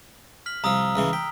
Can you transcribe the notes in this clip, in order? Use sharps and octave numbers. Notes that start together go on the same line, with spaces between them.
F6 B6 F#7
C2 F3 A#5 D#6 E6
C#2 C#3 E3
G5 B6